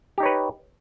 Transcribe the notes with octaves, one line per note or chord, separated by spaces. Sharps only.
D#4 G4 B4 C#5